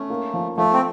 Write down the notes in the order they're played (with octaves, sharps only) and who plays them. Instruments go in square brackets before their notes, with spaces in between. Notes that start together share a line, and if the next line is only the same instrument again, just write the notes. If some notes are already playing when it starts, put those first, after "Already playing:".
Already playing: [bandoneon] A3 [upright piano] C#4
[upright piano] A#3
F3
[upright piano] F3 [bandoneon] A3
[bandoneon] C4